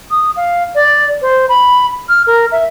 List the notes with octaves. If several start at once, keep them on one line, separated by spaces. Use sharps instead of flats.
D#6
F5
D5
C5
B5
F6
A#4
E5